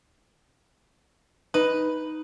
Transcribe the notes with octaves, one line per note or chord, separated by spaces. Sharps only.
D#4 B4